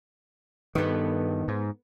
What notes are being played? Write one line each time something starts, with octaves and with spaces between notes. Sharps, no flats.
G2 D#3 B3 A4
G#2